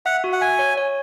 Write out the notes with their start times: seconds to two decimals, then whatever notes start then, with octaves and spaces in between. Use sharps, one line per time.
0.06 E5 F#5
0.24 F#4
0.33 F#5
0.41 E5 G#5
0.59 C#5
0.77 C#5